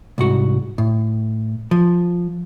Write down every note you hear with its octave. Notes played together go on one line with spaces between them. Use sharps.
C2 G#2 F#4
A2
F3